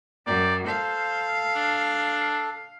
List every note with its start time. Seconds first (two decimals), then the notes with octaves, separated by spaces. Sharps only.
0.27 F#2 D5 G5 A#5
0.67 A4 C5 F5
1.55 D4